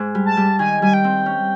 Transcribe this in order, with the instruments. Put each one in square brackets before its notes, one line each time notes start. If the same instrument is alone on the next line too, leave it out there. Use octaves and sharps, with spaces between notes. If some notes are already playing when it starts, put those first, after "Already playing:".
Already playing: [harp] G#2
G3
[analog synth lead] A5
[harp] G3
[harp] D#3 [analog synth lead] G#5
[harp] G3 [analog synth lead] G#5
[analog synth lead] G5
[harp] C4
C#4